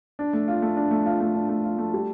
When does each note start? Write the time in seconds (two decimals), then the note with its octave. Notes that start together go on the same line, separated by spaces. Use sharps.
0.19 D4
0.33 A3
0.48 F4
0.62 A3
0.77 D4
0.91 A3
1.06 F4
1.20 A3
1.35 D4
1.49 A3
1.64 F4
1.78 A3
1.93 G3